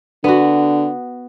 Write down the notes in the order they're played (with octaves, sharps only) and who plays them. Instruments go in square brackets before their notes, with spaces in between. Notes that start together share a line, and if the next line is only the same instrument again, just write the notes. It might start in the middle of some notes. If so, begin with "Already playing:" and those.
[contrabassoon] D3 [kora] B3 F#4